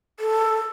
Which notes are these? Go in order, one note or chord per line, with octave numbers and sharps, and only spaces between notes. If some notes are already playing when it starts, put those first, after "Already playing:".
A4